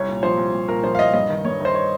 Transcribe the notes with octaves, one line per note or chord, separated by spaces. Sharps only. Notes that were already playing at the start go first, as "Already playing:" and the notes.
Already playing: C2 C#5
A#2
F3 C5
C2
C2
A#2 A#4
F3 C5
F5
C2 D#5
G2 D#5
D#3
G2 C#5
D#3 C5
C#5